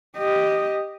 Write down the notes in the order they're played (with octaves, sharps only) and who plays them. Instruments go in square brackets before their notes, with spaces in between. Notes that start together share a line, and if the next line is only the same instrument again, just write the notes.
[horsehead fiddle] G4 D#5